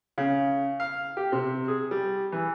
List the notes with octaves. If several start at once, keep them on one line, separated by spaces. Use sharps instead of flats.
C#3
F5
G4
C3
G#4
G3
E3